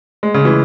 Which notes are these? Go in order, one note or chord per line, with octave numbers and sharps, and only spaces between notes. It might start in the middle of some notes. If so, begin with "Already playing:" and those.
G#3
C#3
E3